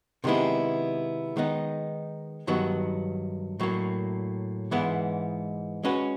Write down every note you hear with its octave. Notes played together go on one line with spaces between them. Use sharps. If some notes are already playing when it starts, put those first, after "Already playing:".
C3 D#3 G#3 B3 E4
D#3 G#3 B3 D#4
G2 D#3 F#3 B3
A2 F#3 A#3
G#2 E3 G#3 B3 E4
G#3 C#4 F#4 B4